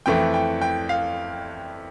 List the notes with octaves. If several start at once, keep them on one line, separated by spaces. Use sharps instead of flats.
F2 E3 A3 G5
G5
G5
F5